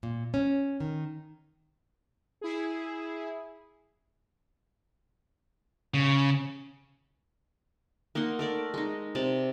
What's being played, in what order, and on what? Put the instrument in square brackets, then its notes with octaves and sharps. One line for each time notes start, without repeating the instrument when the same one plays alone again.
[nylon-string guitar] A#2
C#4
D#3
[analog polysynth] E4 G#4
[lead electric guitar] C#3
[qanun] A#3 D#4 F#5 C6
A3 A#4 D5
G#3 D#4
C3 D5 A5